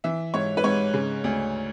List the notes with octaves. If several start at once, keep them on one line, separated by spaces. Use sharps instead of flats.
E3 E5
G#2 C#5
B4
G#2 C#5
C#3
D2